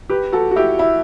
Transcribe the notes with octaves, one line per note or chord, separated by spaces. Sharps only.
G4 B4
F#4 A4
F#4
E4 G4
E4